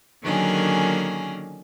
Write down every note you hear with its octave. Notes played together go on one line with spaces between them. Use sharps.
D3 D#3 F#3 A#3 C#4 G#4